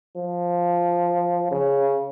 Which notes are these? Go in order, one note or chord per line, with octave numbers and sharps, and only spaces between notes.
F3
C#3